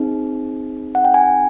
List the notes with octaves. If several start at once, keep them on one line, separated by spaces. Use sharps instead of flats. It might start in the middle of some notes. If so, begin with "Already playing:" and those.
Already playing: C4 D#4 G#4
F#5
G5
G#5